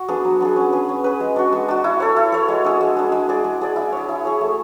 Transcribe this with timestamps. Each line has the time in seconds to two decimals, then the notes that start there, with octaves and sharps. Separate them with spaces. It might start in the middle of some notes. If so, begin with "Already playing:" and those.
Already playing: F#4
0.08 B3 D4 G#4
0.25 F#3
0.40 B3 D4 G#4
0.56 C#4
0.73 G#4 B4
0.89 C#4
1.04 G#4 B4
1.20 G#3
1.36 D4 F#4
1.52 G#3
1.68 D4 F#4
1.84 E4
2.00 A4 C#5
2.16 E4
2.32 A4 C#5
2.48 G#3
2.64 D4 G#4
2.81 G#3
2.97 D4 G#4
3.12 G#3
3.29 D4 G#4 D5
3.44 G#3
3.61 D4 G#4 D5
3.76 E4
3.92 G#4 C#5
4.09 E4
4.25 G#4 C#5
4.41 A3